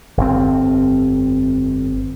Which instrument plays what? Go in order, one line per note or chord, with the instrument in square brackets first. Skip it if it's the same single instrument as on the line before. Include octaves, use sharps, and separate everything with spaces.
[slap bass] G1 F2 C4